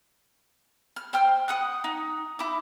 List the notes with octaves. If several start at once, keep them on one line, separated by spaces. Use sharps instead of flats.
F6
C5 G5 F6
F#5 D#6 F#6
D#4
E4 D6